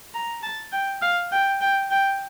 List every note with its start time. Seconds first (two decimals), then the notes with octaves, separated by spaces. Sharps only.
0.14 A#5
0.43 A5
0.72 G5
1.02 F5
1.31 G5
1.61 G5
1.91 G5